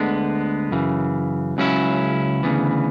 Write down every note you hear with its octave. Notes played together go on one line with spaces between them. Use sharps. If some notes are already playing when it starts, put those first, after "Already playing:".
Already playing: D2 D3 G#3 B3
F#2 C#3 E3
C#2 C#3 F#3 C#4 E4
D2 C#3 E3 B3